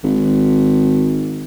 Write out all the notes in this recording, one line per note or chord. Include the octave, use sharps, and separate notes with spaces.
G#1